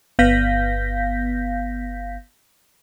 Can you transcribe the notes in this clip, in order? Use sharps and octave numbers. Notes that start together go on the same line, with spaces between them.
G1 B3 F5 G6 A#6 B6